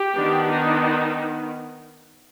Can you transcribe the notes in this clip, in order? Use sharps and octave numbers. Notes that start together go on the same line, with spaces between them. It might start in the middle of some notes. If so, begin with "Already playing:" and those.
Already playing: G4
D#3 B3 D4
D#4